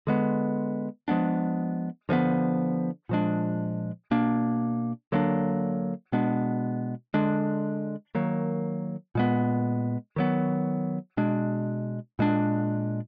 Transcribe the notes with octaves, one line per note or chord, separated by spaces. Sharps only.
D3 G#3 B3
F3 G#3 B3 D4
D3 F3 G#3 B3
A#2 F3 G#3 D4
B2 A#3 D4
D3 F#3 A#3 D4
B2 G#3 B3 D4
D3 G#3 D4
D#3 F#3 A#3
A#2 G#3 B3
D#3 F#3 B3
B2 G#3 D4
A#2 G#3 D4